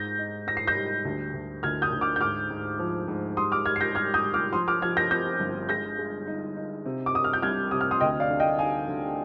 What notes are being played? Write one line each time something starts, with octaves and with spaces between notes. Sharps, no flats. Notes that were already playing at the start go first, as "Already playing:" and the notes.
Already playing: G#2 G6 A#6
D#4
G#2 A#6
C7
G6 A#6
G3
D2
D2
D2 F6 G#6
D#6 G6
D2
D6 F6
G6
G#2 D6 F6
G#2
F3
G#2
G3 C6 D#6
D6 F6
G3 F6 G#6
C7
G6 A#6
G3 F6 G#6
D#6 G6
G3
D6 F6
F3 C6 D#6
D6 F6
F3 F6 G#6
G6 A#6
C4 G6 A#6
G1
G#3 G6 A#6
G#3
D#4
D#4
C3
D6
C3 D#6
F6
G6
C2 F6 G#6
C3 D#6
F6
C6 D#6
D2 D#5 G5
D5 F5
D3
D#5 G5
D#4 F5 G#5
D3